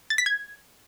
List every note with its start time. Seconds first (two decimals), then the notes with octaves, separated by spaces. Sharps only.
0.10 A6
0.18 B6
0.26 G#6